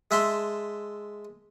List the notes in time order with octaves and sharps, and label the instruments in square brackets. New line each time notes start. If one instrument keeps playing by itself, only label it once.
[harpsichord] G#3 E5 A5 C6